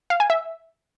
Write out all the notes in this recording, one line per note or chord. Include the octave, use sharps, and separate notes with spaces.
F5
G#5
E5